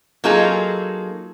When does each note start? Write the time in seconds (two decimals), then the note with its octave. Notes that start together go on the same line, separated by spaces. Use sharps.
0.24 F#3 A#3 D#4 F4 G#4 A4